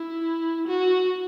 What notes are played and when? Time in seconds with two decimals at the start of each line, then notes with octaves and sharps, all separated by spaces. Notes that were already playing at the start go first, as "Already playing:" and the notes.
Already playing: E4
0.68 F#4